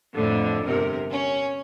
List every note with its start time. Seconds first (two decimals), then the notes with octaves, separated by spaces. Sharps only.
0.14 F2 A2 D3
0.66 G1 C3 A#4
1.11 C#4